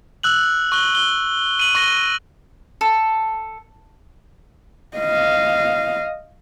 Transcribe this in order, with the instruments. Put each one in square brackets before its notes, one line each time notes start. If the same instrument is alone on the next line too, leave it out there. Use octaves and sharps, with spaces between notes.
[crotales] E6 F#6 F#7
C#6 F#6 G7
G7
D#7 F#7
C#6 A#6 G7
[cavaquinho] A4
[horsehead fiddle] D#5 F5